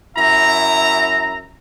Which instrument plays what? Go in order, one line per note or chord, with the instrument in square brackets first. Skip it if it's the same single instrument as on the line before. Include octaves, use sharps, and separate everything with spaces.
[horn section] F#2 E4 E5 A#5